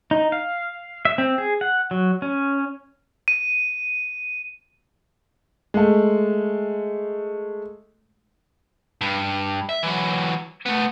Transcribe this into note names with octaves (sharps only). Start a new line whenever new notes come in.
D#4
F5
E5
C4
G#4
F#5
F#3
C#4
D#7
G#3 A3
G2
E5
E3 F#3
A3 B3